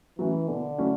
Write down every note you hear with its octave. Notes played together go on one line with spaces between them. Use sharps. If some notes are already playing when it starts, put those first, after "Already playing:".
E3 F#3 A3 C#4 E4
B2 D3
F#3 A3 C#4 E4